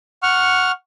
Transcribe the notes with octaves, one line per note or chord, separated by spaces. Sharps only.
F#5 C#6 F6